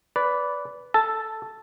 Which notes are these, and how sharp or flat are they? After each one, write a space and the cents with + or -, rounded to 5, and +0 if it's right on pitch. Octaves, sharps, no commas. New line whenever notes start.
B4 +0 D5 -20
A4 +0 A5 -5